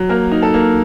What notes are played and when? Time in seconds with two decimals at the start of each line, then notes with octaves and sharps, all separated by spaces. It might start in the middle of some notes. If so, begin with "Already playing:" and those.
Already playing: F#3
0.09 A#3 A#4
0.31 D#4
0.42 A4
0.54 A#3